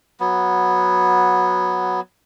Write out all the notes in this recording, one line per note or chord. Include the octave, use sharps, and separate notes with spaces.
F#3 B3